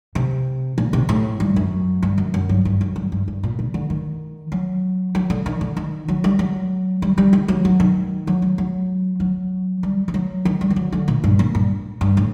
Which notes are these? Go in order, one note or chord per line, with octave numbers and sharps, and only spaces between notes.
C3
A#2
C3
A2
G2
F#2
G2
F#2
F#2
G2
G2
F#2
G2
G2
G2
A#2
C3
D3
D#3
F#3
F#3
D3
D#3
D3
D#3
F#3
G3
F#3
G3
G3
D#3
F#3
F#3
D#3
F#3
F#3
F#3
F#3
G3
G3
F#3
D#3
G3
D#3
F#3
D3
A#2
G2
A#2
G2
G2
A2